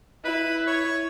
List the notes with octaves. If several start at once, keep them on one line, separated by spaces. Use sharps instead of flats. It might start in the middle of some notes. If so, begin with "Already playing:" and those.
E4 B4
C#5